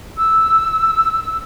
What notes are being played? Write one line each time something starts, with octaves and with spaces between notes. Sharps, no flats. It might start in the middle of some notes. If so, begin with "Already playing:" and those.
E6